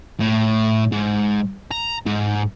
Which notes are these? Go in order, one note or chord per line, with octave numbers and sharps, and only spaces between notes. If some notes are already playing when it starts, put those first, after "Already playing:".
A2
G#2
A#5
G#2